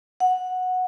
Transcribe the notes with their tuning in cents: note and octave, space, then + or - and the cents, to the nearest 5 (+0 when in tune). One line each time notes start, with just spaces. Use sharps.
F#5 -10